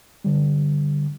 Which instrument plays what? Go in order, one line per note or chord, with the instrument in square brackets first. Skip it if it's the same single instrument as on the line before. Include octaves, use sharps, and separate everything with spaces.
[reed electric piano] D3 G3